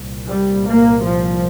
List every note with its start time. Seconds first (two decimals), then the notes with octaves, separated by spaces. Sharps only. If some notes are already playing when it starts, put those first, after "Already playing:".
Already playing: C2 A#2
0.29 G3
0.66 A#3
1.04 F3